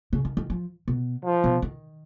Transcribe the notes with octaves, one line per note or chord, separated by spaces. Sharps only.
C#3
D#3
D#3
F3
B2
F3
B2
D#3